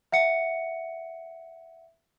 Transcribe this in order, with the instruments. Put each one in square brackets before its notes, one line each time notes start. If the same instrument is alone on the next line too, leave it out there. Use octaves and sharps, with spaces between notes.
[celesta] E5 F#5 C#7